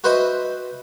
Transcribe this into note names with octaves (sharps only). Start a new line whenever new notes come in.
F#4 B4 C5 D#5 E5